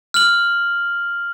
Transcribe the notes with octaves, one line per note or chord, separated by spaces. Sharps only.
F6 F#7